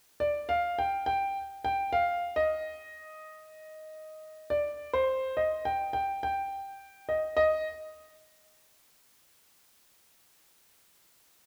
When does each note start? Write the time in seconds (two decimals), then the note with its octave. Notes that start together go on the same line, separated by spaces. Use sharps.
0.20 D5
0.49 F5
0.79 G5
1.06 G5
1.65 G5
1.93 F5
2.36 D#5
4.50 D5
4.93 C5
5.37 D#5
5.65 G5
5.93 G5
6.23 G5
7.09 D#5
7.37 D#5